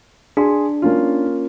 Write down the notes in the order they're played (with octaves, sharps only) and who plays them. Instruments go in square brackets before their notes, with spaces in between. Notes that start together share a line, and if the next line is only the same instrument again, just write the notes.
[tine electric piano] D4 [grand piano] G#4 C6
[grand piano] A#3 C#4 F4